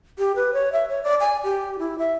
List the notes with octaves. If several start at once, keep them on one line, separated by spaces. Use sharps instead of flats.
G4
B4
C#5
E5
C#5
D5
G#5
G4
E4
E5